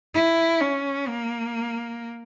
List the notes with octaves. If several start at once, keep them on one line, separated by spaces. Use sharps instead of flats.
E4
C#4
A#3